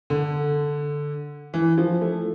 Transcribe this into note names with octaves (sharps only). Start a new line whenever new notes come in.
D3
E3
F3
A3